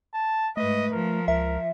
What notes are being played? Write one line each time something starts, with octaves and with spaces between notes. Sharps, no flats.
A5
G#2 A3 B4 D#5
F3 A#4
C#2 A#4 E5